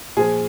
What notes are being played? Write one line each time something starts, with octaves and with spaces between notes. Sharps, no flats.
A#2 F3 G#4